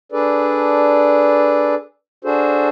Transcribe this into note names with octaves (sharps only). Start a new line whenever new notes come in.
D4 G#4 A4 B4 D5
D4 F#4 G#4 A4 C5